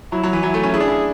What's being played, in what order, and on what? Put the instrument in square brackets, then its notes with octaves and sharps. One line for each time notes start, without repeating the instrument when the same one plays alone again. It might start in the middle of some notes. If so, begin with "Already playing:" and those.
[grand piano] F#3 [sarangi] E4
[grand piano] F#3
E3
[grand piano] F#3 [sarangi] E4
[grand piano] A3
C#4
[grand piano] E4 [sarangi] G#4
[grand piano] D4
E4